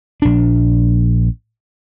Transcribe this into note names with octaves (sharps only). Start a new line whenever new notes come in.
A#1 D4